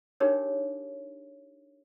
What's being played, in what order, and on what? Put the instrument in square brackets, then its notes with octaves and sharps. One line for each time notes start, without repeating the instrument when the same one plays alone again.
[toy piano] D4 D#4 G4 G#4 A#4 C#5